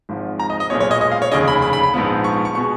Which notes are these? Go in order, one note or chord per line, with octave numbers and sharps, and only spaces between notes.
G#1 G#2 F3
A#5
D#5
D#5
B1 A#2 G#3 B3 C#5
C#5
D#5
D#5
F5
C#5
F1 D#2 C#3 D#5
B5
B5
B5
B5
A#1 G#2 F3 B3
C#6
C#6
B2 G#3 B3 C#6